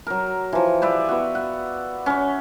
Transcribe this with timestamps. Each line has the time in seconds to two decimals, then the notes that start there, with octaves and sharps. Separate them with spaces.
0.07 F#3 A#4
0.53 E3 F3
0.82 G4 B4 D5 E5
1.09 B3 F#4
1.35 F#5
2.06 C#4 C#5